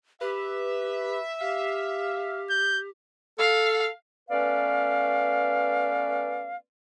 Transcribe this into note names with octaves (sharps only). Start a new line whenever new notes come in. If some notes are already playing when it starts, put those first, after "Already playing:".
G4 B4 E5
G4 F5
G6
A4 F5
A3 B3 C#4 B4 D5 F5